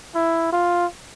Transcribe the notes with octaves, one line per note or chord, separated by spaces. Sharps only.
E4
F4